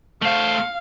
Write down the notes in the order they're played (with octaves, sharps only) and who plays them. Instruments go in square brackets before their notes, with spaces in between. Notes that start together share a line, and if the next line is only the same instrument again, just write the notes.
[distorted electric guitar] A3 C5 [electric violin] F5